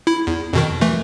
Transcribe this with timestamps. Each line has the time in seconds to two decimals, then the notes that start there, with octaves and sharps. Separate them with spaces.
0.07 E4
0.27 E2
0.53 F2 B2 D#3
0.81 E3 A3